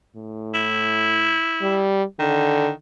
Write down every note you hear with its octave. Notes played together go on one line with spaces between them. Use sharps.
A2
E4
G3
D3 D#3